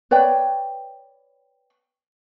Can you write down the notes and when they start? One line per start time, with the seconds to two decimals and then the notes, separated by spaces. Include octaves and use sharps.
0.11 B4 C#5 D5 G5